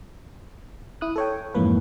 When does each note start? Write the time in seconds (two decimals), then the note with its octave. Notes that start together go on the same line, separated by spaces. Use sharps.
1.01 E4 D#6 F#6
1.16 A4 C#5 G5
1.54 F2 G#2 E3 A#3 B4